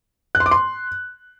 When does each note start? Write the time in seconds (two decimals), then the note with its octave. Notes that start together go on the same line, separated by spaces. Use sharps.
0.35 F#6
0.40 C6
0.46 D6
0.51 C6